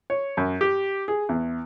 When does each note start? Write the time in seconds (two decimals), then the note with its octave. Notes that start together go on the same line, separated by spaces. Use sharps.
0.10 C#5
0.37 F#2
0.61 G4
1.08 G#4
1.29 E2